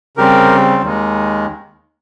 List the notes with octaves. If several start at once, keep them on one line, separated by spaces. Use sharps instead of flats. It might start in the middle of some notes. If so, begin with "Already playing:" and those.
C#3 G3 C4 G4 A#4
D#2 D#3 G#3